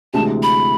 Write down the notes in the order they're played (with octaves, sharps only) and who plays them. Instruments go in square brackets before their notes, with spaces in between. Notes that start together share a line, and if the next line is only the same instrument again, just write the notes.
[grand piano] D2 C3 E3 G#3 D4 [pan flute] A5
[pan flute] B5